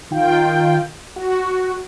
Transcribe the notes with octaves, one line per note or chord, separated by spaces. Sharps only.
D#3 F4 G5
F#4